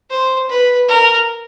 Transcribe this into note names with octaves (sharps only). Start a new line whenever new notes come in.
C5
B4
A#4